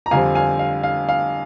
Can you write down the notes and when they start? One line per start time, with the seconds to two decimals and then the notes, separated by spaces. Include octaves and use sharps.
0.06 A#5
0.11 F2 D3 G3 C4 F5 G#5
0.35 F5 G#5
0.59 F5
0.83 F5
1.09 F5